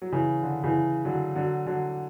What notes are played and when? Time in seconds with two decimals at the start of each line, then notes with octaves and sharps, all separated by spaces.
0.02 F#3
0.12 C#3 E3
0.43 D3
0.64 C#3 E3
1.05 D3 F#3
1.35 D3 F#3
1.67 D3 F#3